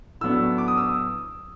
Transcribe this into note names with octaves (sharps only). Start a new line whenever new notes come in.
A2 F#3 B3 D4 E6
D6
D#6
E6